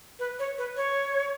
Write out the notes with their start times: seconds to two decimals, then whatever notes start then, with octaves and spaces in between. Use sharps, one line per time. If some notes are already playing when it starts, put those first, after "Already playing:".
0.19 B4
0.39 C#5
0.58 B4
0.77 C#5